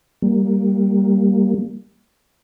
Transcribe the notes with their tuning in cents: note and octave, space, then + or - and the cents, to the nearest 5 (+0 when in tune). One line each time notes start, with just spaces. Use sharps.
G3 +0 A#3 +0